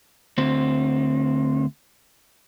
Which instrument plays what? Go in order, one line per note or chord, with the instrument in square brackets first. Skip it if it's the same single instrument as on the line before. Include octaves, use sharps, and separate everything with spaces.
[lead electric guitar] D2 C4